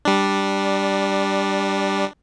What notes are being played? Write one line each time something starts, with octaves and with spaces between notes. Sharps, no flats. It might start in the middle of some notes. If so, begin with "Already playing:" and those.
G3 D4